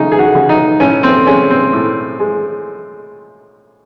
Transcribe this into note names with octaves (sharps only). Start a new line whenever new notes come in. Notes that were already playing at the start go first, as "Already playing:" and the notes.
Already playing: C#3 D#4
G#4
F#4
C#3
D#4
A2 C#4
C4
G#3 C#4
C4
A2
G#3